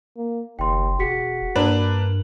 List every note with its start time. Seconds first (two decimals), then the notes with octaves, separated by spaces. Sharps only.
0.17 A#3
0.59 F#1 D#2 G5 C6
1.00 E1 F#4 G#4 B6 C#7
1.56 G2 A#3 D4 A#4 B4 F#7